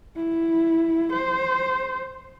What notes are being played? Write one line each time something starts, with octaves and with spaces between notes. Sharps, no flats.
E4
C5